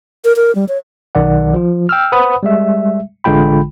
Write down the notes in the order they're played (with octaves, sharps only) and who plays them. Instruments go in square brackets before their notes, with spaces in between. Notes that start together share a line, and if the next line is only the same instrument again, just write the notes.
[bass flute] A#4
A#4
G3
C#5
[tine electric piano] B1 D#3 D5 F#5
F3 F4
G5 E6 F6
B4 C5 F#5 B5 D#6
G3 G#3 E5
A1 D3 G#3 F4 G5 B5